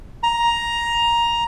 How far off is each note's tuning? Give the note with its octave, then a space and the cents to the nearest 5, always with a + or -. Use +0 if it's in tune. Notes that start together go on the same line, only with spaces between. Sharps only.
A#5 +10